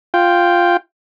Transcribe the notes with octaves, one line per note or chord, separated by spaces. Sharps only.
F4 G5